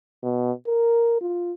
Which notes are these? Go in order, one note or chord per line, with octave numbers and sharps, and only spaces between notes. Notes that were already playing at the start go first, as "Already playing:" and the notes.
B2
A#4
F4